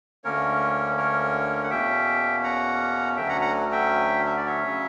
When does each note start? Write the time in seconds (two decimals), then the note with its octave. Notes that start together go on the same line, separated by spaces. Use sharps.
0.24 D2 D3 A#3 C#4 A#4 C#5
0.98 A#4 C#5
1.64 F#5
1.70 E2 B2 A#3 C#4 E5 G5
2.43 F#5 A#5
3.17 D2 D3 F#3 C#4 E5 G5
3.29 F#5 A#5
3.41 F#5 A#5
3.72 E5 G5
4.26 E5
4.37 D5
4.46 C#5 E5
4.63 C#3 F#3 C#4